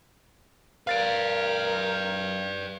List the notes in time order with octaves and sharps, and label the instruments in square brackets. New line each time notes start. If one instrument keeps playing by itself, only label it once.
[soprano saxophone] A#4 [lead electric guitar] B4 D5 [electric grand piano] F5 A6 D7